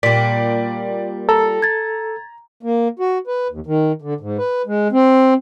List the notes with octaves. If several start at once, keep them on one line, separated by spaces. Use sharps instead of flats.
A#2 G3 D5 B6
A4 A#5
G#6 A6
A#3
F#4
B4
D#2
D#3
D3
G#2
B4
G#3
C4